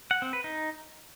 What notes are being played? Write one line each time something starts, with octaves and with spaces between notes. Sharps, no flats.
F#5
C4
B4
D#4